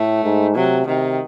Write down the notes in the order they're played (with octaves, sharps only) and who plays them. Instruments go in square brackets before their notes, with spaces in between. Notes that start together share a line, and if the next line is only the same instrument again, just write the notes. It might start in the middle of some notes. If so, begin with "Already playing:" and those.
Already playing: [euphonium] A2 [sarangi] A3
[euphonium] G#2
[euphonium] C3 [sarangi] F#3
[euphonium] C3 [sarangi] D#3